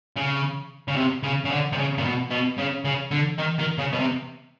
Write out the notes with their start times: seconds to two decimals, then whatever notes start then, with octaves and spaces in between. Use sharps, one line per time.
0.16 C#3
0.88 C#3
0.96 C3
1.23 C#3
1.45 C#3
1.50 D3
1.72 C3
1.77 C#3
1.98 A#2
2.04 B2
2.31 B2
2.58 C#3
2.85 C#3
3.11 D3
3.38 D#3
3.58 D#3
3.78 C#3
3.92 B2
3.99 C3